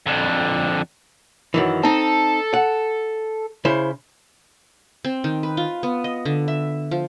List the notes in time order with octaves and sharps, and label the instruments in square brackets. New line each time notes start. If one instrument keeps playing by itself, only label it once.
[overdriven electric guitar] F2 D3
[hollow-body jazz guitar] F#2 D#3 E3
[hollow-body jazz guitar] C4 D#4 [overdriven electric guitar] A4
[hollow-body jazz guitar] F#5
C#3 E4 C5
[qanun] C4
D#3
B4
F4
B3
D#5
D3
E5
F3